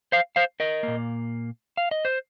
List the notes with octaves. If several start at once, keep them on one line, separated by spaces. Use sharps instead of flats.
C5 F5
C5 F5
A#4 D#5
A#2 A#3
F5
D#5
C5